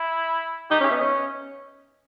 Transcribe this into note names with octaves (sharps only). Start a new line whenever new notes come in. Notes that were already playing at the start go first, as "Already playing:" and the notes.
Already playing: E4
D#4 G4
C#4 E5
B3
C#4 D#5